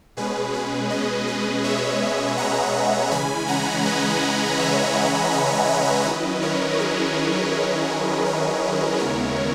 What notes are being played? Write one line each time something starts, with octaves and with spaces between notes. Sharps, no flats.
B2 G#3 C#4 G#4 B4
G#4 B4
B4 D#5
B4 D#5
C#5 E5
F#5 A#5
C#3 E3 G#3 C#4 G#5 B5
F#5 A#5
B4 D#5
C#5 E5
D#5 F#5
C#5 E5
D#3 F#3 C#4 E4 B4 D#5
A#4 C#5
G#4 B4
G#4
A#4
A#4 C#5
D#2 C#3 G#3 B3 E4 A#4 C#5